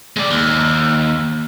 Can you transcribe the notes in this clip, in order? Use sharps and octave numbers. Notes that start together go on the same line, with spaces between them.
G#3 D5
D#2